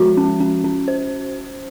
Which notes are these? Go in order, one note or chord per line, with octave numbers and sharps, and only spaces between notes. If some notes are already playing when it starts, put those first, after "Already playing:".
Already playing: F3 G#3 F#4
C#4
C#4
C#4
C5